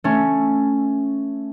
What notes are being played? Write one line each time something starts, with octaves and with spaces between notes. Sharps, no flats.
A3 C#4